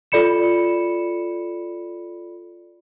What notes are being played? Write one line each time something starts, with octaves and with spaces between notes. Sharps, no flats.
F4 A4 D5 B5 C#7 E7